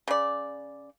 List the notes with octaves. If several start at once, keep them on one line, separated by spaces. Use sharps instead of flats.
C#3 D5